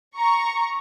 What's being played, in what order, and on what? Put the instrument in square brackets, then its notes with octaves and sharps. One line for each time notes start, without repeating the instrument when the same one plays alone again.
[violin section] A#5 C#6